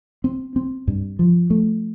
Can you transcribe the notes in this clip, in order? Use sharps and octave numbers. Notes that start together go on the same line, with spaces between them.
C4
C4
G2
F3
A3